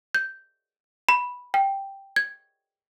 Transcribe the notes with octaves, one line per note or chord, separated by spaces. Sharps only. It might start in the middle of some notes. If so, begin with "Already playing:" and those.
G6
B5
G5
G#6